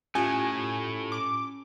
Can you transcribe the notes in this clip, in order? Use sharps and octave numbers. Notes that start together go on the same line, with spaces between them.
A2 A3 C#4 F4 G4 G#5
D6